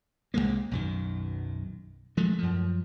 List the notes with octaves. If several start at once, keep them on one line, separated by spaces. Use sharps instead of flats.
C2 F#2 G#3 A#3
B1 F#2 D#3
F3 G#3 A3
F#2 F3